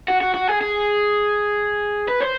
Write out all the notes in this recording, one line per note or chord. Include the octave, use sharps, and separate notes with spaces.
F#4
F#4
F#4
G#4
G#4
B4
C5